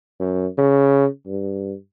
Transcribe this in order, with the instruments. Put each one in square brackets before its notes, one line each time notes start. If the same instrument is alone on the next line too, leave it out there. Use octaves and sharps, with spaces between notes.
[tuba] F#2
C#3
G2